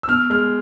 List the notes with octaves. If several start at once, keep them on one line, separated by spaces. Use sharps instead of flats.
E6
B2 F6
G#3 F6